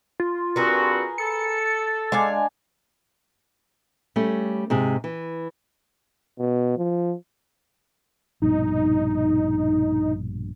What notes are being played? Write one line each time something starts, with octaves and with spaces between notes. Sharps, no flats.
F4
G2 C4 F#4 G#4 A#4 B4
A4 C#7
G#3 D4 F5 G#5
G3 A3 C#4
G#2 C3 G#4
E3
B2
F3
A#1 G2 B2 D#4